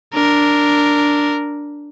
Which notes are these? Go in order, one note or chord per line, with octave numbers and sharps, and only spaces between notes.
D4 A#4